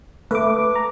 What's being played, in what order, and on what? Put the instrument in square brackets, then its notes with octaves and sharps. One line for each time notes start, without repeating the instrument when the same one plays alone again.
[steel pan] A3 [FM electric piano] B4 D6
[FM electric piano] A#5